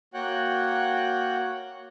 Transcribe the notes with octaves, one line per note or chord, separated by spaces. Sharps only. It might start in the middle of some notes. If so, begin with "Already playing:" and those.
A#3 F#4 C#5 F#5 G5 F#6